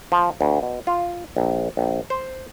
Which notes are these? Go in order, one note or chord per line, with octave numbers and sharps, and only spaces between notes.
F3
D2
B2
F4
A#1
A#1
C5